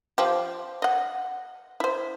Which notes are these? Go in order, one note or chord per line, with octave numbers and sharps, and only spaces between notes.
F3 G4
D#5 F#5
E4 C5